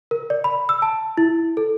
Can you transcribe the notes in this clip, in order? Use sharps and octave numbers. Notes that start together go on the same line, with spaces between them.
A#4
D5
B5
E6
A5
E4
A4